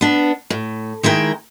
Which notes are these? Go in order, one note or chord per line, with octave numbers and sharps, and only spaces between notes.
B3 D4
A2
D#3 G#3 E4 A#4 G5